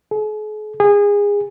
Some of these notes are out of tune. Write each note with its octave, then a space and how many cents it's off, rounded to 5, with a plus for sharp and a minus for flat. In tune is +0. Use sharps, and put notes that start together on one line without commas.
G#4 +45
G#4 -25